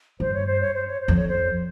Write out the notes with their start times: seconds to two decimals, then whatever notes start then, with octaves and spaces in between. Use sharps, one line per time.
0.20 G2 C5
0.34 C#5
0.47 C5
0.61 C#5
0.74 C5
0.87 C#5
1.01 C5
1.08 F2
1.15 C#5
1.29 C5